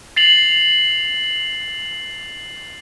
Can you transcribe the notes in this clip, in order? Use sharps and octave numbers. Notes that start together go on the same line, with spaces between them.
A6 C7 F7 F#7